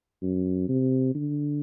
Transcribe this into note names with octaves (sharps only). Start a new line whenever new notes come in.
F#2
C3
D3